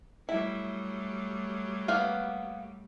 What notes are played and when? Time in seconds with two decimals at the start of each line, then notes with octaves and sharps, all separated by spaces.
0.29 F#3 G3 A3 E4
1.88 A#3 B3 F5